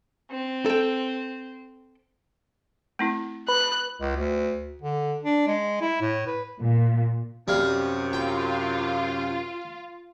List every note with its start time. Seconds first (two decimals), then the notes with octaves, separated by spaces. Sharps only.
0.30 C4
0.66 A4 G5
2.99 A3 C4 E4
3.48 B4 F#6
4.00 C#2
4.16 D2
4.82 D3
5.24 D4
5.47 G#3
5.81 E4
6.01 A2
6.27 B4
6.60 A#2
7.48 F#2 C3 G3 F5
8.13 F4 G5